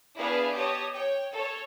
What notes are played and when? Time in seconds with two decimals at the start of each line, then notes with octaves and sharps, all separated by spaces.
0.17 B3 D4 E4 G#4 B4 F5
0.54 G4 C#5 D#5 A5 D#6
0.94 C#5 G5
1.32 A4 C#5